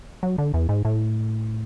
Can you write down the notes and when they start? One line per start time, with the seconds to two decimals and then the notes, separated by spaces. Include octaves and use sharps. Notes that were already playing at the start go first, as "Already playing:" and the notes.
0.23 F#3
0.38 D3
0.54 E2
0.69 G#2
0.85 A2